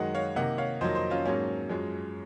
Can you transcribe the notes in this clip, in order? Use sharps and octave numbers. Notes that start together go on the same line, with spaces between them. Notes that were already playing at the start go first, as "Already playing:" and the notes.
Already playing: F#2 D#3 G#3 D#5 F#5
C#5 F5
C3 D#3 A#3 D#5 F#5
C#5 F5
F2 D#3 F#3 A#3 C5 D#5
C5 D#5
C#4 F4
G#2 F#3 A#3 C#4
F#2 F3 G#3